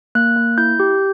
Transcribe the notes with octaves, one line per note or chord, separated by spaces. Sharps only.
A#3 F#6
A#3
E4 G6
G4